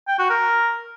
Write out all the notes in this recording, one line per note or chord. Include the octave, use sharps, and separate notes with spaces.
G5
F#4
A#4